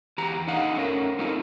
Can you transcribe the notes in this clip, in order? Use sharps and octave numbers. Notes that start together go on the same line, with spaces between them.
E2 E3 G4 A#5
D3 D#4 D#5 F5 F#5
A3 C#4 A#4
A3 C4 D#4 F4 A#4